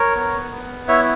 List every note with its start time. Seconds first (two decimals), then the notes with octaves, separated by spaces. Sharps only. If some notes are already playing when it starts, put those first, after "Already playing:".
Already playing: A#4 C#5
0.15 B3
0.52 B3
0.88 E4 C#5 E5